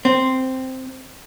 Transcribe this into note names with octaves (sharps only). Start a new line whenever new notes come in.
C4